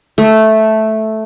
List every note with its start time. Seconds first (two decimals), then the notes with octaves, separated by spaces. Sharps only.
0.18 A3